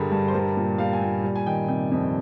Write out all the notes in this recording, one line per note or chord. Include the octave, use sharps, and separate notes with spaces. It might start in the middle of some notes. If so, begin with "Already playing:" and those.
Already playing: G2 D3 G3 G#4 A#4
G2
C5
G3 A#4
A#2
G3 F5
G#5
A#2 G5
G3
G#5
D#3 G5
C3 G5
F2